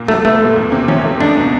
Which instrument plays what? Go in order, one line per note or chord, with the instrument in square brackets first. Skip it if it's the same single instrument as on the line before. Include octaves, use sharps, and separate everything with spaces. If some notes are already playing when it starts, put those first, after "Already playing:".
Already playing: [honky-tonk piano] A#2 A#3
[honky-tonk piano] F#3 [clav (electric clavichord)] A3
[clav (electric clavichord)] A3 [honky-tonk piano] B3
[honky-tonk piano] A#2
E2
C3
[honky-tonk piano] F3 [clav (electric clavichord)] C#4
[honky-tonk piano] A3
[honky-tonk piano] C#2 [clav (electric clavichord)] D4
[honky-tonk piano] B2